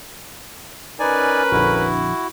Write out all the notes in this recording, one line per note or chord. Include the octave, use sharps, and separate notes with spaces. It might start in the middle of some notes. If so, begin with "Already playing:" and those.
C#4 D#4 A#4 B4 D5 G#5
A#1 F2 D3 E4 F#4